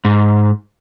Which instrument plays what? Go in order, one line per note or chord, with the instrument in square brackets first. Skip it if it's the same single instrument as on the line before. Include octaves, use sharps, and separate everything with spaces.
[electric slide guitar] G#2